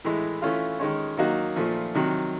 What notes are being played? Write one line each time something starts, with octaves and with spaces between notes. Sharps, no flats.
A2 E3 G#3
E3 A3 C#4 F4
D#3 G#3 C#4
D#3 F#3 A#3 D#4 F#4
A#2 F3 A3
C3 D#3 F#3